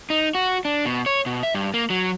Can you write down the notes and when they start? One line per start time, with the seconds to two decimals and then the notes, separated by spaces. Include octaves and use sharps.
0.10 D#4
0.35 F#4
0.65 D4
0.85 B2
1.06 C#5
1.26 B2
1.43 E5
1.55 G2
1.74 A#3
1.90 F#3